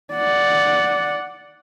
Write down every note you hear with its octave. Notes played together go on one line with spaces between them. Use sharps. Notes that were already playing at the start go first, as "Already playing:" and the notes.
D5 F#5